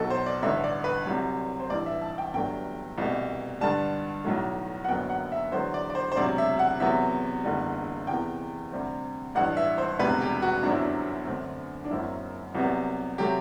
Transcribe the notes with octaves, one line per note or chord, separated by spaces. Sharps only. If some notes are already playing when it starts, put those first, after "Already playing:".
Already playing: B1 B2 F#3 A4
C5
D5
A1 G2 D3 E5
D5
B4
C2 C3 F#3
C5
A1 G2 E3 D5
E5
A5
G5
G1 G2 F#3 A3 G5
C2 B2 A3
G2 D3 G3 A5
B1 A2 F#3 A3
F#5
F#1 F#2 D3 F#3 B3 G5
F#5
E5
E2 D3 F#3 B3 C5
D5
D5
C5
C5
E1 D2 C3 F#3 D5
E5
F#5
E2 C3 F#3 B3 E5
F#1 E2 D3 G3
E2 C3 E3 B3 G5
D2 C3 G3 C4
A1 G2 E3 F#5
E5
C5
E1 D2 C3 G3 B3 B4
G4
F#4
G1 F#2 F#3 C4 D4
E4
D4
F#2 D3 A3 C4
D4
F#1 F#2 F#3 C4 E4
C2 C3 F#3 B3
C3 F#3 A3 G4